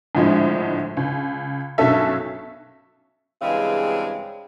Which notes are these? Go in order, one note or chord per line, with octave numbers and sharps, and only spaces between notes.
G#1 D2 A2 D3 F3 G#3
C#2
B1 G2 F#3 C#4 A4 E5
G2 C#3 E3 G#3 C4